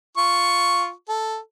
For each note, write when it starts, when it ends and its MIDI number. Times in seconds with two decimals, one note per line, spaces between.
0.17 0.90 65
0.17 0.90 85
1.09 1.38 69